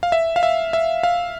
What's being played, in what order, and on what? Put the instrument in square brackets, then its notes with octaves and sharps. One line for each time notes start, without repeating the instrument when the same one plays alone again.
[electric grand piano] F5
E5
F5
E5
E5
F5